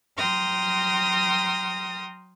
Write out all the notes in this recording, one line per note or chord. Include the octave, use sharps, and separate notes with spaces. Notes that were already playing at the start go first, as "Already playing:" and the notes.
F#3 G5 A#5 C6 D#6 F6